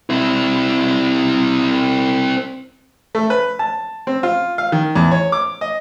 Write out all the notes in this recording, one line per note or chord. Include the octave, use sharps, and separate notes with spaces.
C4 E4
A3
B4
A5
C4
F4
F5
D#3
E2
C#5
D6
D#5